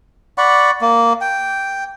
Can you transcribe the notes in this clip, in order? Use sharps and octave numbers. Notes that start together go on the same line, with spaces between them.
D5 F#5 B5 C#6
A#3
G5